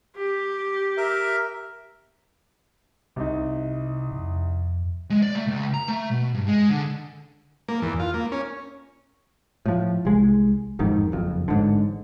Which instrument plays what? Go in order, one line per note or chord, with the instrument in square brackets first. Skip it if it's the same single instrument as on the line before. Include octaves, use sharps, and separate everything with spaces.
[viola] G4
[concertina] A#4 E5
[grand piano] C2 D#4 [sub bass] C3
[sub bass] F2
[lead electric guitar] G#3
D5
A3
C#2
A#5
A3
B2
G2
G#3
D3
[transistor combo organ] A#3
E2
F4
A#3
C#4
[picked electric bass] A2 F3
C2 G#3
A1 F2 G#2 D#3
F#1 F2
A1 G#2 D3